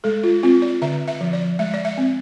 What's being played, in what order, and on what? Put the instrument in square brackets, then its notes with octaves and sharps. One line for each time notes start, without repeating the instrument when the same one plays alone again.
[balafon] G#3 A4
F4
C4 F4
D5
D3 E5
E5
F3
D5
G#3 E5
D5
E5
C4